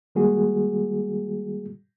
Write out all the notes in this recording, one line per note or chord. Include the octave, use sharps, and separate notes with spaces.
D#3 G3 G#3 A#3 F#4 G#4